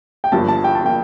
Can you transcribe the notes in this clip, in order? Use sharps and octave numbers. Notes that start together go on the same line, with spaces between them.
G5
G1 G2 F3 A#3 A5
A5
G5
A5
F3 A#3 G5